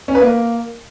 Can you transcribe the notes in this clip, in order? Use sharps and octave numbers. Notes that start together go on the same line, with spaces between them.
C#4
B4
A#3